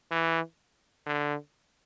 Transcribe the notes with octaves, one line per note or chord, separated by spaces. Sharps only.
E3
D3